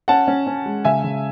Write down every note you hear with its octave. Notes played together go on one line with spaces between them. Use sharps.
C#4 F#5 A5
C#4
C#4
G#3
C#3 E5 G#5
C#3